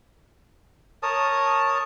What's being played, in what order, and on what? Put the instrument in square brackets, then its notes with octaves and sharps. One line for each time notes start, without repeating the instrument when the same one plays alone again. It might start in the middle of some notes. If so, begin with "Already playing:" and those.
[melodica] A#4 C#5 A5 D#6